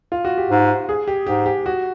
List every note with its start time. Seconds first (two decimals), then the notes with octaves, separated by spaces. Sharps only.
0.12 F4
0.25 F#4
0.38 G4
0.50 G#2
0.89 G#4
1.08 G4
1.27 G#2 G4
1.46 G4
1.66 F#4